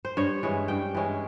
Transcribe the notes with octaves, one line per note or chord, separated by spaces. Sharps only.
C5
G2 C#5
E3 G#3 C#4
G2 G5
E3 G#3 C#4